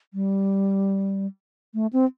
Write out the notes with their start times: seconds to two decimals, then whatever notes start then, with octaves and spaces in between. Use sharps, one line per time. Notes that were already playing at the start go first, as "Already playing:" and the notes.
0.14 G3
1.74 A3
1.93 C4